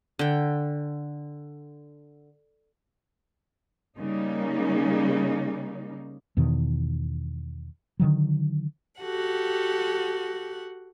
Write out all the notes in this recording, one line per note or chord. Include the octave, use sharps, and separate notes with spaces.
D3 G5
C#3 G3 A#3 D#4
E2 B2 D#3
D3 D#3 F#3
F#4 G4 A4 F#5